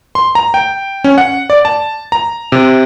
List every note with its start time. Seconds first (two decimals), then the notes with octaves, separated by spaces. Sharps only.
0.15 C6
0.35 A#5
0.54 G5
1.04 C#4
1.18 F#5
1.50 D5
1.65 A5
2.12 A#5
2.52 C3